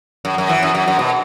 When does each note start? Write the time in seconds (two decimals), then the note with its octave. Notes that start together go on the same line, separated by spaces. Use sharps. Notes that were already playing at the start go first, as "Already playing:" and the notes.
0.25 F#2
0.38 F#2
0.49 E3
0.63 F#2
0.75 F#2
0.88 F#2
0.99 B2